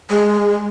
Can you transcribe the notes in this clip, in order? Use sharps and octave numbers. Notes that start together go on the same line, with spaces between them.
G#3